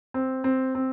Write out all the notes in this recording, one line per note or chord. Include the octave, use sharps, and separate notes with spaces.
C4
C4
C4